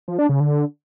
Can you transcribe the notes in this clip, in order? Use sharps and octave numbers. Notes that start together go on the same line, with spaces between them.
F3
D4
C#3
D3